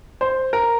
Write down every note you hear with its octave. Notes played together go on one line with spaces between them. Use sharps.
C5
A#4